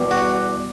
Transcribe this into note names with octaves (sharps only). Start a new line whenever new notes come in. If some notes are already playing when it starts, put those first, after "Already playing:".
Already playing: E2 B2 G3
F#4